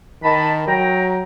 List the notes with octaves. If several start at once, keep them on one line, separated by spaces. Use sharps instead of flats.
D#3 D#5 A5 B5
F#3 G5 A#5